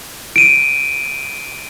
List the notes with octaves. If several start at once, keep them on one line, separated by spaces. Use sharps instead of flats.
D7 D#7